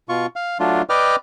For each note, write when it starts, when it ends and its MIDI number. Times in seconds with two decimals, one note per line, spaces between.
0.09 0.26 47
0.09 0.26 65
0.09 0.26 85
0.36 0.58 77
0.60 0.82 54
0.60 0.82 57
0.60 0.82 62
0.60 0.82 65
0.90 1.16 71
0.90 1.16 74
0.90 1.16 75
0.90 1.16 79
0.90 1.16 86
0.90 1.16 89